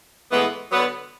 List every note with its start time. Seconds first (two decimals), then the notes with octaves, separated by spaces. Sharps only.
0.31 A2 E3 G#3 B3
0.72 D3 F#3 B3